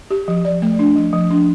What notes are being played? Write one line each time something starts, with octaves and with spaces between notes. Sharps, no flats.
G4
F3
D5
A3
D4
F3
F3
D4